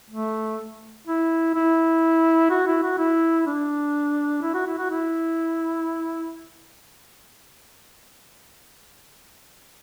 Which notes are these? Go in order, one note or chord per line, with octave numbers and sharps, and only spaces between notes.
A3
E4
E4
F#4
E4
F#4
E4
D4
E4
F#4
E4
F#4
E4